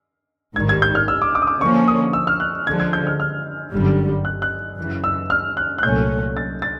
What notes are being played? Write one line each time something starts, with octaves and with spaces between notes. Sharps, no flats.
A1 G#2 D#3 G3 G#6
G#6
G6
F6
E6
D6
D6
D#6
D6
D3 F3 A#3 C#4 C#6
D#6
E6
F6
F#6
D3 F3 G#3 G#6
G#6
G6
F6
F6
G1 F#2 D3 G3
F#6
F#6
F#2 C#3 E3
E6
F6
F#6
F#6
C2 A#2 F#3 A3 C#4 G6
A6
A6